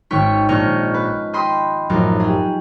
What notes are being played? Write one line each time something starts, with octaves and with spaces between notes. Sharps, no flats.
G#1 D#3 C#4 G5 C#6 B6
A#1 D#5 C#6 F6 G6
B4
D#5 G5 B5 C6 D#6
A1 F#2 F3 D#4
G4 G#4